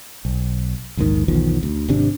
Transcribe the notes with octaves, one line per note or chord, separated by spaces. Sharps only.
B1
A#1 D#2 G#2 D#3
B1 E2 D#3 F3
D2
G#1 C3 D4